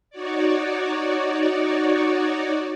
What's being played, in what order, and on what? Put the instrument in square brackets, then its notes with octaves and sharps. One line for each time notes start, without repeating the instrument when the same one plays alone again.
[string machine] D#4 F#4 C#5 D5